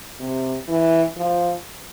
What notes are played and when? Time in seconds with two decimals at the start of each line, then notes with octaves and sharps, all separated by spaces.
0.20 C3
0.68 E3
1.17 F3